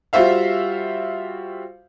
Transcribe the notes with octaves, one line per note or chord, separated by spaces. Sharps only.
G3 F4 F#4 C5 E5 F5